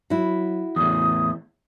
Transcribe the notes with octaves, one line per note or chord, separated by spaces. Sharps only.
F#3 E4 F#4
E2 A2 E3 D#6